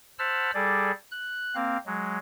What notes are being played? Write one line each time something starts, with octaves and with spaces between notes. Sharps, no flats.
C5 F#5 A5 B5 E6 F6
G3 G#4 A4 D5
F#6
A#3 C4 F5
F#3 G#3